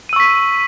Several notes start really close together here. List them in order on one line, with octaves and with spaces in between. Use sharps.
D#7 E6 C#6 B6